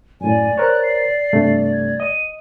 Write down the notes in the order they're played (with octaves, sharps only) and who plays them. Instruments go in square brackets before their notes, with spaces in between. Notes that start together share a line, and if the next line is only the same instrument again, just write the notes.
[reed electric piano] F#2 A2 [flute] D5 [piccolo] G#5
[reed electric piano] A#4 C5 C#5 [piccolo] F#6
[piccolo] C7
[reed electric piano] G2 C3 A3
[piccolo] G#6
[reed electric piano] D#5 [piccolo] D#7